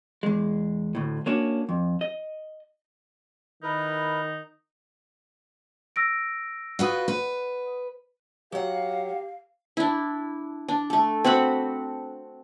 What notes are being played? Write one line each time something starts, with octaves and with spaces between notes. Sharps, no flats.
E2 G#3
D2 A2
A#3 C#4 D4 F#4
F2
D#5
D#3 D#4 E4 A#4 B4
E6 A#6 D7
F4 F#4 B4 D5 F#5 D#6
B4
F#3 G4 F5 F#5
D4 E4
D4
A3 A4
C4 F#4 F#5 B5